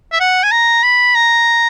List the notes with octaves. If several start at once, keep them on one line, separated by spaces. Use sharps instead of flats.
E5
F#5
G#5
A#5
B5
A#5